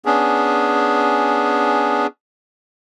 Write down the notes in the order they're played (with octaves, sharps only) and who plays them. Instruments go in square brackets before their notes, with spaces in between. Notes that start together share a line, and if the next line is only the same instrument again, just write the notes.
[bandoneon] B3 C#4 D4 G#4